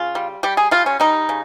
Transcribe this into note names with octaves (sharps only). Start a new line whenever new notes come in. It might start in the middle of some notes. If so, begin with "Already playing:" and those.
Already playing: C#3 F4
G3
G3 G4
G#4
G3 F4
C#4
G3 D#4
C#3